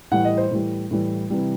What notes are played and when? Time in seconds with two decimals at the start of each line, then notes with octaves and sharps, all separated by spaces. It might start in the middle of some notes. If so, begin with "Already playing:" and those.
0.11 A2 E3 G3 F#5
0.25 D#5
0.37 C5
0.51 A2 E3 G3
0.91 A2 E3 G3
1.30 C3 E3 G3